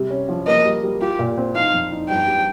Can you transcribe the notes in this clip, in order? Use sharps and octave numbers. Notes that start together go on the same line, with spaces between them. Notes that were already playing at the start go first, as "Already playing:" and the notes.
Already playing: C3 G3
C#4
F3
A#3 D#5
G3
G3
F4 G4
A#2
C4
D#4 F5
F2
D#4
G2 G5
G3